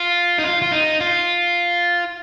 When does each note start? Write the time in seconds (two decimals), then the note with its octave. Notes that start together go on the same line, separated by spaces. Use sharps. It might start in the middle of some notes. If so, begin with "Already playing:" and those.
Already playing: F4
0.38 D#4
0.44 F4
0.62 F4
0.72 D#4
1.01 F4